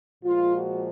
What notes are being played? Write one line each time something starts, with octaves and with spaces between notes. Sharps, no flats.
A#2 F3 G#3 F4
F#4